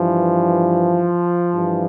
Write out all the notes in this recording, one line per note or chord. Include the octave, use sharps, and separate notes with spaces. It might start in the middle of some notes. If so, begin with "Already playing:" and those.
Already playing: G2 E3 F3
G2 E3